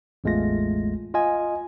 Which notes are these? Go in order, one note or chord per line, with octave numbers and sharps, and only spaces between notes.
A1 E2 G#3 A3 F4 A#6
F4 D#5 G#5